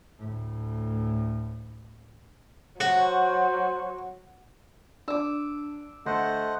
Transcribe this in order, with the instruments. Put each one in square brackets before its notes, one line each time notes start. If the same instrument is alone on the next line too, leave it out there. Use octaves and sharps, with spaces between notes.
[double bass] D2 A2
[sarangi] F#3 [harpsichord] F#4 [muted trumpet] C5
[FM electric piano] D4 [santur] D6 E6
[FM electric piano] D3 [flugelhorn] A3 [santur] C5 [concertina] D#5 F#5